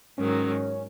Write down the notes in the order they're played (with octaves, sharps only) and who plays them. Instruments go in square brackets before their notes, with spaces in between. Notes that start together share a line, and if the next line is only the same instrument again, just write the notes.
[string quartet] G#2 D#3 F#3 [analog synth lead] C#4